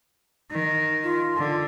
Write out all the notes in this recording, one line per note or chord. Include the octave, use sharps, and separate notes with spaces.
D#3
F4
D3